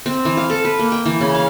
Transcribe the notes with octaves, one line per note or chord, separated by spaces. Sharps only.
C4
E3
F5
A4
B4
A#3
G5
E3
C#3
F5